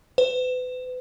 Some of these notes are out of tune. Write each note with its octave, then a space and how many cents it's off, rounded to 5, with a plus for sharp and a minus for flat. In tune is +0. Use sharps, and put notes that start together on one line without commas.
B4 +40